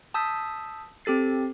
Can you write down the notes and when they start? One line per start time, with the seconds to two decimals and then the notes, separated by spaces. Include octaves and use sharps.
0.14 A5 D#6 E6 G6 B6
1.05 C4 G4 A4 A6 C7